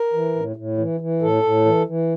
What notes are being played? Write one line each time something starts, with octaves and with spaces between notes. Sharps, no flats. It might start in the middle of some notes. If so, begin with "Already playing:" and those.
Already playing: A#4
E3
A2
A2
E3
E3
A2 A4
A2
E3
E3